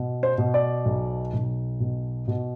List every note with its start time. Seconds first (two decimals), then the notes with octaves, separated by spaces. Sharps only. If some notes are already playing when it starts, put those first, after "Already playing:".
Already playing: B2
0.23 C5
0.38 B2
0.54 D5
0.86 B1
1.33 B1
1.80 B2
2.27 B2